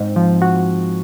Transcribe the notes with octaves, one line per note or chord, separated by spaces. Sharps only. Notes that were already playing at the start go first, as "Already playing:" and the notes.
Already playing: G#2 C4
F3
F#4